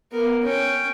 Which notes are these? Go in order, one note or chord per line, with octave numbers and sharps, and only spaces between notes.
B3 A#4
C#4 G5